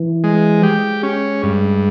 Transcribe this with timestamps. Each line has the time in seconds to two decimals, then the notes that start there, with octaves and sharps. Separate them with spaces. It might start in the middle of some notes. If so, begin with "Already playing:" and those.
Already playing: E3
0.24 G#3
0.63 G#3 G4
1.03 C#4
1.43 G2